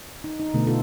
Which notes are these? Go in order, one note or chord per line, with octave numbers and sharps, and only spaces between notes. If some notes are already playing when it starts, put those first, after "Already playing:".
D#4
D#4
B2 D3 A3 B3
B2 B3 D#4 F4 A4